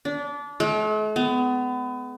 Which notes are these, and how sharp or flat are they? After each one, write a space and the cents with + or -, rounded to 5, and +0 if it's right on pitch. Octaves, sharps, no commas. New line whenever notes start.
D4 -25
A3 -45
B3 +30